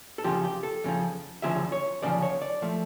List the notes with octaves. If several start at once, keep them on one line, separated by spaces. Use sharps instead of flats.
A4
F2 C#3 F3 G4
G4
A4
F2 C#3 F3
D2 C#3 F3 E5
C#5
D2 C#3 F3 D5
C#5
D5
F3 A3